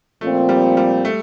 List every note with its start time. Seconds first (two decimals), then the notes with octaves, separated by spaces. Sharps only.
0.21 A#2 F3 A3 C4
0.49 G3
0.77 G3
1.05 A3